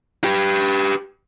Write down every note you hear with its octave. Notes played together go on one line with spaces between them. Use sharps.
G4 B4